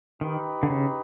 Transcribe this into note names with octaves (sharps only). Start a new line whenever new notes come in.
D#3 D#4 G4 B4
D3
C#3